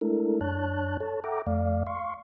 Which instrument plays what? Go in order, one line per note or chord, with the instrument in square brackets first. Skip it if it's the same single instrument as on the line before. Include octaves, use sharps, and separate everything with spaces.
[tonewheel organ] G#3 A3 D4 E4 A4 A#4
F#2 D4 C#5 A5 F#6
A4 C#5 A5
A4 E5 F#5 G5 A#5 D6
F2 A3 D5 F5
F5 C6 C#6